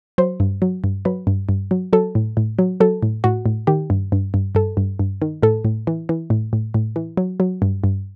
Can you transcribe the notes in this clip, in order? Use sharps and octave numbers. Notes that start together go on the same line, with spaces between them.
F#3 C5
G2
F#3
G2
F#3 B4
G2
G2
F#3
F#3 A4
A2
A2
F#3
F#3 A4
A2
A2 F#4
A2
D#3 G4
G2
G2
G2
G2 A4
G2
G2
D#3
A2 A4
A2
E3
E3
A2
A2
A2
E3
F#3
F#3
G2
G2